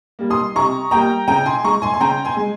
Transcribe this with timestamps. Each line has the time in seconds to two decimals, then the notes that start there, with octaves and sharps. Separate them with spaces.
0.19 G3 A#3
0.30 C6 D#6
0.55 C3 A#5 C#6
0.91 G3 A#3 G5 A#5
1.28 C#3 G5 A#5
1.46 G#5 C6
1.64 G#3 A#5 C#6
1.82 G#5 C6
1.93 C6
2.00 C#3 G5 A#5
2.25 G#5 C6
2.36 G#3